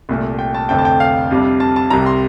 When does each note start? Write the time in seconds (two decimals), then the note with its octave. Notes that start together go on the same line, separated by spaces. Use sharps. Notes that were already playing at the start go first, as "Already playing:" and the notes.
0.09 C2 A#2 A3
0.39 G5
0.54 A5
0.69 F1 F2 D3 A3 C4 G5
0.78 A5
0.85 G5
1.00 F5
1.31 F2 C3 G3 D4
1.60 A5
1.76 A5
1.90 C2 C3 G3 A#5
2.06 C6